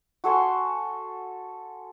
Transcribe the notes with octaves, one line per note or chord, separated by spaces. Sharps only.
F#4 A4 G#5 C6